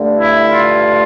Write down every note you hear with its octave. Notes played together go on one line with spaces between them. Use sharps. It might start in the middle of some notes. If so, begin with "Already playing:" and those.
Already playing: G2 D3 A3
E4
F4